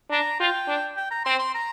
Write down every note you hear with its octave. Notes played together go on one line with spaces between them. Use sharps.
D4 A#5
F4 G5
D4
G5
A#5
C4 C6
C6
A#5